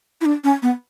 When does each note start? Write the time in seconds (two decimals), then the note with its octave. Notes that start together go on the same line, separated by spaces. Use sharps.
0.21 E4
0.25 D4
0.44 C#4
0.62 B3